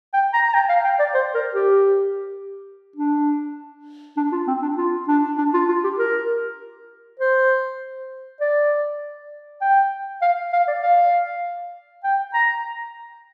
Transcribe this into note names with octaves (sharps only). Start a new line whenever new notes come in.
G5
A#5
A#5
G5
F5
G5
D5
C5
A#4
G4
D4
D4
F4
C4
D4
F4
D4
D4
F4
F4
G4
A#4
C5
D5
G5
F5
F5
D5
F5
G5
A#5